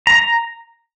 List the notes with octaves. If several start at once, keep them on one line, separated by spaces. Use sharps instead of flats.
A#5